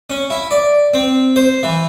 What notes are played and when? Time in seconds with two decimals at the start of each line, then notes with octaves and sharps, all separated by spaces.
0.10 C#4
0.30 E4
0.51 D5
0.94 C4
1.36 C5
1.63 E3